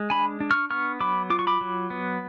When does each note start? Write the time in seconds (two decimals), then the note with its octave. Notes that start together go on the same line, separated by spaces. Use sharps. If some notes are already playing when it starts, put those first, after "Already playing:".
Already playing: G#3
0.10 D4 G#5 B5
0.40 D4
0.51 C#6 F6
0.70 B3 C#6 F6
1.00 F#3 B5 D6
1.30 F4 D6
1.39 C#6
1.47 B5 D6
1.61 F#3
1.90 B3